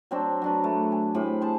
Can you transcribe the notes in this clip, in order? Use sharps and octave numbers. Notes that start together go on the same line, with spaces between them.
F#3 C4 D4
F#3 D4 B4
A3
G#5
A2 C3 C5 B5
G#4 C5 A5